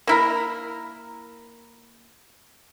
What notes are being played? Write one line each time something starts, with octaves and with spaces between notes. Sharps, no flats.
A#3 E4 A#4